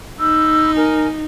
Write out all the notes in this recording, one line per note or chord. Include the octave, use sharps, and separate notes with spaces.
D#4 B5 E6 G6
A#4 G#5